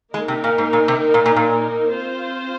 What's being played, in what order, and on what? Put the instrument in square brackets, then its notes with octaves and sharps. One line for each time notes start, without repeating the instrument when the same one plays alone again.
[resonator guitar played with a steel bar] G#3 [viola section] A#3 D#4 A#4
[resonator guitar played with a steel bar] C3
A#2
G#2
A#2
C3
A#2
A#2
A#2
[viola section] C4 F4 C5